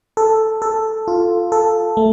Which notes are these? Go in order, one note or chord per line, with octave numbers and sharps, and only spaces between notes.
A4
A4
F4
A4
A3